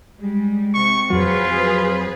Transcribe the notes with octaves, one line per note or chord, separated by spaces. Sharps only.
G3 G#3
C3 C#6
F2 F#3 F4 G#4 B4 C5